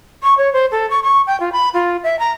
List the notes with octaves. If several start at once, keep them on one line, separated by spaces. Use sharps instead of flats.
C#6
C#5
C5
A4
C#6
C#6
G5
F4
B5
F4
E5
A#5